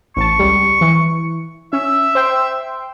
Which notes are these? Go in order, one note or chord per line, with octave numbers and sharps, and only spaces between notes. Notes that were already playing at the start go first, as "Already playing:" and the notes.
A1 A5 C#6
C#2 G3
E3
C#4 E5
C5 G5 C6